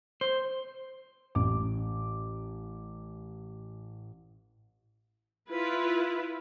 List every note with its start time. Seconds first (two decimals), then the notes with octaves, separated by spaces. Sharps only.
0.21 C5
1.35 A1 D6
5.51 E4 F4 B4